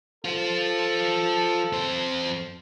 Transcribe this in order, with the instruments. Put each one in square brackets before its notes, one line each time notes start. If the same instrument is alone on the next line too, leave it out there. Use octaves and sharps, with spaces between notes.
[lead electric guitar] F4 C5 [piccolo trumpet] A4
[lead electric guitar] F2 C5